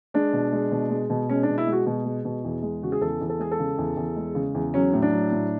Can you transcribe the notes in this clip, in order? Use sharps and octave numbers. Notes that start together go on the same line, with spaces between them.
G#3 D4
B2
G#3
B2
G#3
B2
G#3 C#4
D4
B2
E4
G#3
F#4
B2
G#3
B2
E2
G#3
C#3 F#4
G#4
E2 A4
E2
A4
G#3 G#4
A4
C#3
E2
E2
G#3
C#3
E2
F#3 C#4
A2
D4
F#3
A2